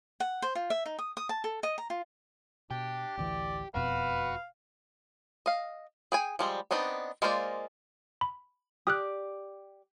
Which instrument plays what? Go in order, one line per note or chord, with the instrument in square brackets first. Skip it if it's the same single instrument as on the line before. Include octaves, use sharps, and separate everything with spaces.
[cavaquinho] F#5
C5
F4
E5
D#4
D#6
D#6
A5
A4
D#5
A#5
F4
[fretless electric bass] B2 [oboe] D4 [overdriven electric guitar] G4
[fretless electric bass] A1 D2 E3 [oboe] D5
[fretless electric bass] E1 F2 B2 [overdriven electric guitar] F#4 [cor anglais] B4 [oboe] F5
[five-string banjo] D#5 F5
G#4 G5 G#5
F3 G3 G#3
B3 C4 D4 D#4 B4
G#3 A#3 F4 C5 D5
[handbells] B5
[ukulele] G4 D5 [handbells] D#6 F6 F#6